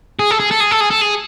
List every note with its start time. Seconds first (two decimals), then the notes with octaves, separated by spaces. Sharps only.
0.19 G#4
0.31 A4
0.40 G#4
0.51 A4
0.60 G#4
0.71 A4
0.80 G#4
0.90 A4
1.01 G#4